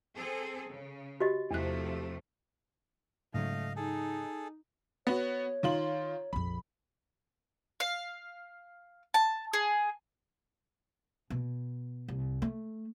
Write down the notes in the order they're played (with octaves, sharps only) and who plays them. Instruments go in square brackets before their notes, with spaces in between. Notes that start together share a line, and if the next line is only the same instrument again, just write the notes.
[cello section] C4 G#4 A4
C#3
[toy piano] F#4 G4 D#5
[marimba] E2 F#6 [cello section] C3 F3 A3
[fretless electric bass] G#2 C#3 F#3 [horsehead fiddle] A3 [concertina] D#5 F5
[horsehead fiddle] D#4 [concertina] G#4 A4
[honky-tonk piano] B3 F#4 [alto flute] C#5
[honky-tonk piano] D#3 F4 F#7
[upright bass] A#1 F2 [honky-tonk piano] B5
[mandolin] F5
A5
G#4
[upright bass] B2
C2
A3